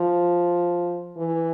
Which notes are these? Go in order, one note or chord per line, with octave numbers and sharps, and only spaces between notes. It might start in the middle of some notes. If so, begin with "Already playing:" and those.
Already playing: F3
E3